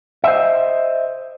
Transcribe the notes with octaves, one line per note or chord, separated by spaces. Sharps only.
C5 D#5 E5